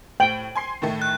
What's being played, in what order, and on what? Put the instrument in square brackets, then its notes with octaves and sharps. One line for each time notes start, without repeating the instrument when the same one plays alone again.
[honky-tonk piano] A2 F#7 [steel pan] G5
[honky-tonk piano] G#5 C6 C7
A2 D#3 A3
[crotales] F#6